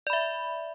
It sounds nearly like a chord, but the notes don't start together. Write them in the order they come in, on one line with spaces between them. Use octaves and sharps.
D5 B5 E5